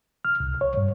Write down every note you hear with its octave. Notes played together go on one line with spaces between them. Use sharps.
F6
C2
C#5
G2